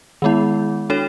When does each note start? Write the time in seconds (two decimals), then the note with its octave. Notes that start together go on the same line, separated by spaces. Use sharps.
0.22 D#3 G#3 B3 E4
0.90 D4 F#4 A4 C#5